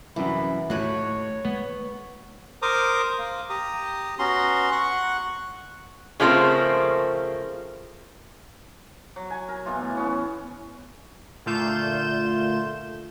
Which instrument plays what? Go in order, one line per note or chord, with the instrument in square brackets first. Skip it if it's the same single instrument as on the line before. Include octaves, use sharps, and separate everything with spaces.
[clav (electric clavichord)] C2 F#2 [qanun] E3 [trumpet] B5
[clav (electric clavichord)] D#2 A2 [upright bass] A3 [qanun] F#4 B4 [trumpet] C#5
[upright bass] G#3 [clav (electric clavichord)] B3
[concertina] A#4 C5 A#5 D6 D#6
A#3
G4 A#5 D#6
B3 C#4 F#4 A#5 C6
F#5 C#6 F#6
[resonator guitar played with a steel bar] C#3 F3 A3 A#3 C4
[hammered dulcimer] F#3
G#5
A#4
B2 E3 F4
A2 E3
B3 C#4
[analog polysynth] A#2 D3 A3 F4 G6 E7